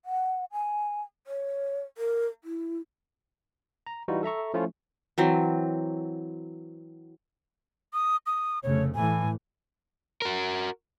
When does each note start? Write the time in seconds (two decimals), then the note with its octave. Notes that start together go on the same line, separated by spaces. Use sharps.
0.05 F#5
0.52 G#5
1.27 C#5
1.98 A#4
2.44 E4
3.87 A#5
4.08 E3 G3 D#4 F4 F#4
4.23 A4 E5 A#5 C#6
4.54 F3 A3 C#4 E4 F4
5.18 E3 F#3 C4
7.93 D#6
8.26 D#6
8.63 F1 C#3 A3 C#5
8.95 A2 E3 A3 G#5
10.22 F#4 A#4